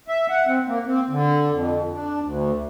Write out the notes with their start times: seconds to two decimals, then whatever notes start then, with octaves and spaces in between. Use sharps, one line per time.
0.08 E5
0.29 F#5
0.47 C4
0.67 A#3
0.85 C4
1.10 D3
1.51 F2
1.92 D4
2.22 D2